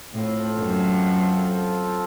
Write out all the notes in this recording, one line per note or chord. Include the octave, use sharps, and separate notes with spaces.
A2 C4 F4 A4
F#2